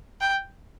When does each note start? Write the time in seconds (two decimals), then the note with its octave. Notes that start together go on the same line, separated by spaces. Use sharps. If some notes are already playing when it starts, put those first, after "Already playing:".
0.21 G5